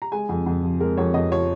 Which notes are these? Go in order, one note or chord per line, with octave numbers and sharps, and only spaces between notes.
A#5
G#3 G#5
F2
F2
F3
G#3 A#4
F2 C#5
F2 D#5
F3 C#5